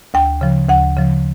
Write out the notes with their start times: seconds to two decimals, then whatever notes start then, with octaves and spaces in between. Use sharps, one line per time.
0.14 D2 G5
0.41 C#3 F3
0.69 D2 F#5
0.97 C#3 F3